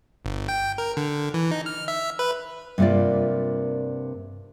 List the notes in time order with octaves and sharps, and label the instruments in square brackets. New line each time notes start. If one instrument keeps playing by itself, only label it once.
[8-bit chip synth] G1
G5
A#4
D3
E3
D#4
F6
E5
B4
[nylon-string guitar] G2 C3 A#3 F4 D5